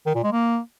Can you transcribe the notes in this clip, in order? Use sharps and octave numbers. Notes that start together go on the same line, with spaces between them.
D#3
A#2
G#3
A#3